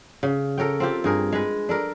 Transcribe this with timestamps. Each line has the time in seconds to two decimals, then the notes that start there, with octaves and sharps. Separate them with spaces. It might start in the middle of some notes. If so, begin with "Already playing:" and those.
0.23 C#3
0.58 A4 A#4 C#5 G5
0.80 C4 F4 G4
1.04 G2 G#4 A#4
1.32 G#3 B4
1.69 D4 A4 A#4